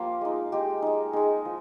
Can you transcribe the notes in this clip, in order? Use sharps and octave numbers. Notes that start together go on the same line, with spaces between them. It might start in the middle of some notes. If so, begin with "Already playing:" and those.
Already playing: F3 A#3 F4 G4
G#3 D#4
G#3 D#4 G4
G#3 D#4
G#3 D#4 G#4
F3